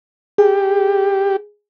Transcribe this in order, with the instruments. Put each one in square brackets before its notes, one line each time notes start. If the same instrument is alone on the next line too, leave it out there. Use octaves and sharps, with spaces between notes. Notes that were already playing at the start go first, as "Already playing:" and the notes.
[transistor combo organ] G4 [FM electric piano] G#4